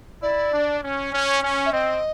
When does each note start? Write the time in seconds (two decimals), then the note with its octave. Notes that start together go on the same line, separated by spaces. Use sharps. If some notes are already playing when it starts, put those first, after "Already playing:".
0.22 E4 D5
0.53 D4
0.83 C#4
1.13 C#4
1.43 C#4
1.66 E5
1.73 C4 D#5